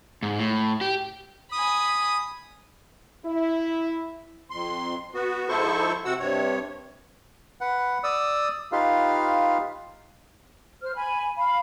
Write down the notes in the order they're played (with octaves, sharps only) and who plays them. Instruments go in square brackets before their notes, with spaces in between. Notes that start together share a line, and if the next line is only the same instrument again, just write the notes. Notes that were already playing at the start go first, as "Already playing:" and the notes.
[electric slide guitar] G#2
A2
G4
[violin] G#5 B5 [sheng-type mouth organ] D#6
[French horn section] E4
[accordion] F2 C6
B3 F#4
G#2 F3 E4 A4 C5 C#6
C3 F#4 F#5 E6
G2 C3 C#5
[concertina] B4 F#5
D5 D#6 E6
D#4 F4 G4 B4 F5
[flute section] C5 F6
G#5 B5
F5 B5